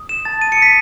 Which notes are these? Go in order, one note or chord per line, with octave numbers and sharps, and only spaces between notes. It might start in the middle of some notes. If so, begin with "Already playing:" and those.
Already playing: D#6
E7
A5 A6
D#7
D#6 C#7
B6